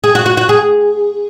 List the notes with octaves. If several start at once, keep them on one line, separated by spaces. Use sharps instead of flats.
G#4
F#4
F#4
F#4
G#4